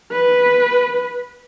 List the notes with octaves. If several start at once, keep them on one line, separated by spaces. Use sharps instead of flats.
B4